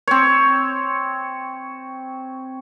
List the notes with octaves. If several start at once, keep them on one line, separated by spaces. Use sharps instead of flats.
C4 C#5